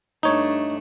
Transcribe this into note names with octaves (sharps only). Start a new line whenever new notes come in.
G2 A3 D4 D#4 C#5